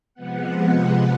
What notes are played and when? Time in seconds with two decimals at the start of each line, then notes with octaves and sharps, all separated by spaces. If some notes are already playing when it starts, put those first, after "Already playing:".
0.14 C3 F3 G#3 B3 F#5